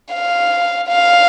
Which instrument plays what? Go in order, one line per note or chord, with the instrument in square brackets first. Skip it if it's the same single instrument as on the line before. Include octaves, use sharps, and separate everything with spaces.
[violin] F5
F5